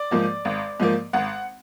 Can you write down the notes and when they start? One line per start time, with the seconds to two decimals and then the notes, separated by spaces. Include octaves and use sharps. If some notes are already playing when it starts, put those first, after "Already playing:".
Already playing: D5
0.11 G#2 F3 A#3
0.45 G#1
0.80 G#2 F3 A#3
1.13 G#1 F#5